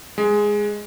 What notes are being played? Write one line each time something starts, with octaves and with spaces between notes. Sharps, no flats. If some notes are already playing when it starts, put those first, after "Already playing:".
G#3